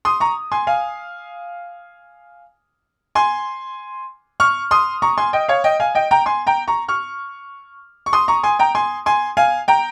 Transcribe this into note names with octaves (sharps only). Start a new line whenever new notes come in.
C6 D#6
A#5 C#6
G#5 C6
F5 G#5
G#5 C6
C#6 F6
C6 D#6
A#5 C#6
G#5 C6
D#5 G5
C#5 F5
D#5 G5
F5 G#5
D#5 G5
G5 A#5
G#5 C6
G5 A#5
A#5 C#6
C#6 F6
C#6
C6 D#6
A#5 C#6
G#5 C6
G5 A#5
G#5 C6
G#5 C6
F5 G#5
G5 A#5